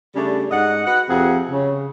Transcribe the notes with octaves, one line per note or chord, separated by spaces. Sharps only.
C#3 G3 A3 D4
G#2 D#5 F#5
F#4 B4 F#5
F2 C3 G#4 F#5
C#3